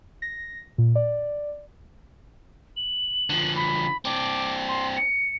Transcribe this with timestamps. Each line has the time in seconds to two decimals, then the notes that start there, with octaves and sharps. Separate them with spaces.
0.22 A#6
0.78 A#2
0.95 D5
2.76 F#7
3.30 D3 F3
3.56 B5
4.05 C4 D4 D6
4.68 C6
4.96 C#7